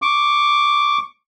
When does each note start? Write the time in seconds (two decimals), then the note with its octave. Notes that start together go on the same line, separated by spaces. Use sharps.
0.02 C#6 D6